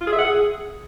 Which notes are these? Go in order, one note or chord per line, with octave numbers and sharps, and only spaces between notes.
F4
G#4
E5
F#5
G#4